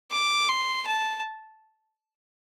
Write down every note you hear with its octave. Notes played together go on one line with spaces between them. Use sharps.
D6
C6
A5